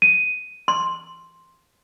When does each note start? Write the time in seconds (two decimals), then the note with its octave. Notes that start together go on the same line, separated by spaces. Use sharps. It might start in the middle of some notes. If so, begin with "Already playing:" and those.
0.02 D#7
0.68 C6